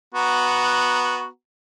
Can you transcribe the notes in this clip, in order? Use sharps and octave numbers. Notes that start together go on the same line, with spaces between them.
B3 F#4 A#5